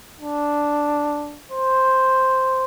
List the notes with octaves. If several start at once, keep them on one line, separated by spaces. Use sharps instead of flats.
D4
C5